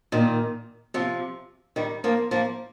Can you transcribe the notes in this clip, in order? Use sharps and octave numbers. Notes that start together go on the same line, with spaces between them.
A#2 D#3
C3 F3
D#3 G3
F3 A#3
F3 A#3